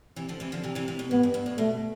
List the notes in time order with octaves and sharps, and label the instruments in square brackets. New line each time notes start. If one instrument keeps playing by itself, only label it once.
[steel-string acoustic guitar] C3 E3
D3 F3
C3 E3
D3 F3
C3 E3
C3 E3
C3
B2
[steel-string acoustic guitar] A2 [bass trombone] B3
[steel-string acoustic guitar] G2
G2
A2
[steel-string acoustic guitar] B2 [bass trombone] A3